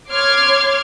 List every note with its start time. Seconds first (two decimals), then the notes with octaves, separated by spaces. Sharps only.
0.11 C#5 C6 D6 F6 G#6